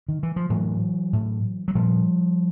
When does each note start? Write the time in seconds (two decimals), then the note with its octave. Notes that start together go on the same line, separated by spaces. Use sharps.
0.09 D#3
0.23 E3
0.36 F3
0.50 A2 E3 F#3
1.13 A2
1.68 F#3
1.75 A#2 F3 G3